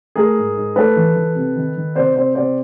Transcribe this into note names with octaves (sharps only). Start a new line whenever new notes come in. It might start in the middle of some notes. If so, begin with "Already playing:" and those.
A3 G#4 A#4
G#2
G#2
A3 A4 B4
E3
E3
C3
D#3
D#3
C3 C5 D5
C3 C5 D5
C3 C5 D5